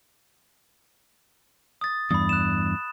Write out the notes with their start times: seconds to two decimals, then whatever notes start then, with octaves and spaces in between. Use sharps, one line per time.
1.81 D#6 A6
2.11 E2 G2 B5 D#6
2.29 F#6 E7